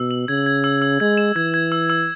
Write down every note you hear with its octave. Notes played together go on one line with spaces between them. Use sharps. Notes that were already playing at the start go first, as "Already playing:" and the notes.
Already playing: B2 E6
F#7
C#3 G#6
G#6
E6
E6
G#3 G#6
E7
E3 G#6
G#6
E6
E6